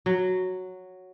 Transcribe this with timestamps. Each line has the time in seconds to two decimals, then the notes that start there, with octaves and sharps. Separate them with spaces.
0.06 F#3